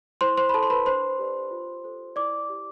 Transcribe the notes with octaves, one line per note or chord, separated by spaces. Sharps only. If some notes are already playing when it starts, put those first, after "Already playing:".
E4 C5 C6
C5 C6
B5
A4 C5 A5
C6
B4 B5
D4 C5 C6
G4 B4 D5
F4
A4 C5
E4 D5 D6
G4 D5